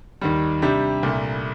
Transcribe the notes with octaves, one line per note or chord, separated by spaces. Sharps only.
D#2 D#3 G3
C3 G3 D4 G4
C2 A#2 A3